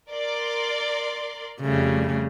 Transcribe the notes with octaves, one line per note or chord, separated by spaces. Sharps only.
A#4 D5 C6
F2 C#3 G3 A3